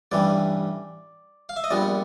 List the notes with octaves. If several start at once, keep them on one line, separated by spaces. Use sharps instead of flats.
A1 G2 E3 G3 D5
F5
E5
D#5
A#1 A#2 G3 B3 D5